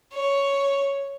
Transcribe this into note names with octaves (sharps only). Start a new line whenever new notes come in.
C#5